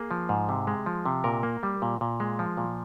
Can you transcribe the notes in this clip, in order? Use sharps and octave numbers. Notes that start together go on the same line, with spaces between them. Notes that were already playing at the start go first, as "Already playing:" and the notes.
Already playing: A#3 G#4
F3
G#2
C3
G#3
F3
C3
A#2 A#4
A#3
G3
A#2
A#2
G#3
F3
A#2